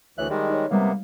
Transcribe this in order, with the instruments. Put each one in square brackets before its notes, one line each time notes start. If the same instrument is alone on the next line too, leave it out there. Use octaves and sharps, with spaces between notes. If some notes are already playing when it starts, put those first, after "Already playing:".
[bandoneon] D2 E3 F#6 [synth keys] A4 C#5 E5
[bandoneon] D#3 G3 G#3 [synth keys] D5
[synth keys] D#4 C#5
[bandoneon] C3 A#3 B3 [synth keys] G3 G#3 F5